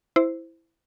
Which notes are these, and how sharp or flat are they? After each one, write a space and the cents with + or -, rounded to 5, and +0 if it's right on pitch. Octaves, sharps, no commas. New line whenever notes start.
E4 +0 C5 -10